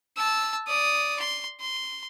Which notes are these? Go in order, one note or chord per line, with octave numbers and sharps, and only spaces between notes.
A5 E6
D5 D#6
C6
C6